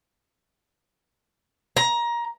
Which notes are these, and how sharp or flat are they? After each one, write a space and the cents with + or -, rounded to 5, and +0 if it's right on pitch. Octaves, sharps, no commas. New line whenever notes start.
A#5 +20